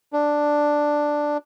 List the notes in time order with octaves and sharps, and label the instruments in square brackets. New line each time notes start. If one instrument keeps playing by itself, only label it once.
[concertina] D4